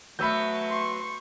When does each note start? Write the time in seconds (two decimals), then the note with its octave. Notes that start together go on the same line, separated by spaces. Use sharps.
0.19 F#3 A3 B3 B5 E6 G6
0.69 C6 C#6